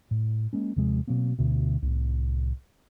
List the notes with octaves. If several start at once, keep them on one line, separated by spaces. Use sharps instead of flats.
A2
G#3 A#3 C#4
D#2 C3 F3 G#3
B2 F#3 A#3 C4
D2 B2
C2 A2